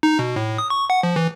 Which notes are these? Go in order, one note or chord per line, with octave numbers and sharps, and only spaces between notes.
D#4
B2
A2
D#6
C#6
F#5
F3
E3